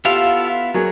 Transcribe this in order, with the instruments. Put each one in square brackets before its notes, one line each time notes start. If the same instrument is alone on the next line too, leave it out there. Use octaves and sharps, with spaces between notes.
[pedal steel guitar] B3 E4 F5 [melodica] F4 A4 [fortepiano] G4
[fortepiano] F#3 A#3 G#4 [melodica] C#5